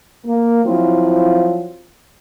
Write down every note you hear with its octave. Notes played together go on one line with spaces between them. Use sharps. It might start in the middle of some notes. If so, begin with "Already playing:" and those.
A#3
F3 F#3 C4 E4 F4